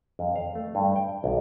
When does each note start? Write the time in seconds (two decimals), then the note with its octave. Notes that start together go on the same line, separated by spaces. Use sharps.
0.19 F2
0.36 F5
0.55 A3
0.75 G2
0.96 G5
1.24 B1